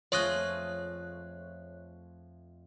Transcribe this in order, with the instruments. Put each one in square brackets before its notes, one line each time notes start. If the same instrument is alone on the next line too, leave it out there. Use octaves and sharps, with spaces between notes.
[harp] F2 A3 [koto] F4 G#4 D#5 [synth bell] C#5 C#6 F#6